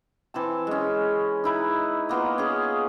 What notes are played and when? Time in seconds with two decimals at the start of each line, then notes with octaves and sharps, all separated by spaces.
0.34 E3 C4 A5
0.67 G#3 C#4
1.44 D#4 E4 B4
2.09 A#3 B3 F4 D#5
2.38 C#4 G#4